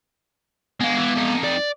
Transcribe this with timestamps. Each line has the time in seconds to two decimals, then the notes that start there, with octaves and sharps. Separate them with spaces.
0.80 G#3 B3 F5
0.97 E3
1.16 F2 D#4
1.44 D5